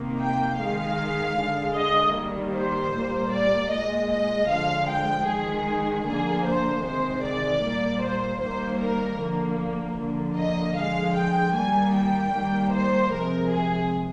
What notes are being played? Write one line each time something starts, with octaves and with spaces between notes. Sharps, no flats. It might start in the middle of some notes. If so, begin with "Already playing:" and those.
Already playing: C3 D#3 A#3
G5
D#3 G#3 F5
D3 G#3
D#5
D#3 G3 A#3
C5
A#2 G3 A#3
D5
A#2 G#3 D#5
D#5
D3 F3 G#3 F5
G5
D#3 G#3 G#4
D3 F3 A#3 G#4
C5
C3 D#3 G#3 C5
D5
A#2 G3 A#3
C5
D#3 G3 A#3 C5
A#4
D3 F3 A#3
D3 F3 A#3
D#5
D3 F3 G#3 F5
G5
D#3 G3 A#3 G#5
G5
D#3 G3 A#3
C5
C3 F3 G#3 A#4
G#4